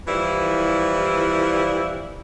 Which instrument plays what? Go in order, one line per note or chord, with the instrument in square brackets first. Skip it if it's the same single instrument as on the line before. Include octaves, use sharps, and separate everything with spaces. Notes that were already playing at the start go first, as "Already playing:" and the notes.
[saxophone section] E3 F3 G3 E4